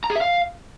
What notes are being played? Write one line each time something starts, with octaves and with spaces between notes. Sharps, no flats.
A#5
G#4
E5
F5